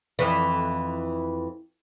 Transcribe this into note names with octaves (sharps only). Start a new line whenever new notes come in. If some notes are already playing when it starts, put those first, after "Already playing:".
F2 E3